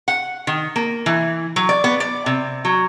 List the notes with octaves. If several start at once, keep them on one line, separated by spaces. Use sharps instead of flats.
F#5
D#3
A#3
E3
F#3
D5
B3
D5
C3
F#3